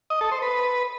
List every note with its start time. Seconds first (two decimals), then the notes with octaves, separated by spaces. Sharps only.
0.10 D#5
0.21 A4
0.32 C5
0.42 B4